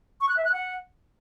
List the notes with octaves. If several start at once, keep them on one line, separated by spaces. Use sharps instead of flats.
C#6
F#6
E5
F#6
F#5